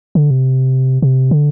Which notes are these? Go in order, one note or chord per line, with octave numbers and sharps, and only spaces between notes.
D3
C3
C3
D3